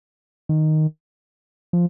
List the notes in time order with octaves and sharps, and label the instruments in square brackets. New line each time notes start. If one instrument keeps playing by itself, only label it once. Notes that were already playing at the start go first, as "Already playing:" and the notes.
[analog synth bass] D#3
F3